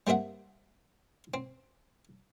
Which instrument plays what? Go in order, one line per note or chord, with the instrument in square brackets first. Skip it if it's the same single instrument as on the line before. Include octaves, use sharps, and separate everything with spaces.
[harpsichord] G3 A#3 C4 E5 F#5
C4